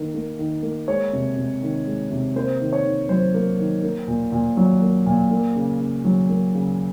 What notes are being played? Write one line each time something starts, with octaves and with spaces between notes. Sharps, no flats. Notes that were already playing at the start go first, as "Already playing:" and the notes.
Already playing: D#3 A#3
A#3
D#3
A#3
G#3 C#5
C3
C3
D#3
G#3
C3
A#3 C5
D#3
C#5
D#3
F#3 C5
A#3
D#3
A#3
A#2
A#2
F#3
A#3
A#2
A#3
C#3
C#3
F#3
A#3
C#3